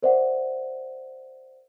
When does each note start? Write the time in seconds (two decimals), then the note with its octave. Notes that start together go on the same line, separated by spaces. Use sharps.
0.03 A#4 C5 D5 E5 F#5